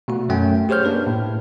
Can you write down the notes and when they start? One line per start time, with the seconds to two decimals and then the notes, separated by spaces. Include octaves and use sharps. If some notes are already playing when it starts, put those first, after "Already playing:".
0.08 B2 A3 F#4
0.29 F#2 A3 G5
0.69 G4 G#4 C5 C#5 F6 G6
0.85 A#3 D4 B4
1.07 A2